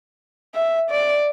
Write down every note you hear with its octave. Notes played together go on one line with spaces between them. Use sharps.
E5
D5